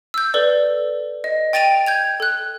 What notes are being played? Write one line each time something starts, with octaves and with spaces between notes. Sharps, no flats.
E6 G6
A4 B4 D5
D#5
G5 A6 D7 D#7 F7
G6 G#6 F7
A4 F#6